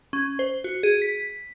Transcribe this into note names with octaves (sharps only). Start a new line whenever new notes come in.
C#4
C5
F#4
G#4
B6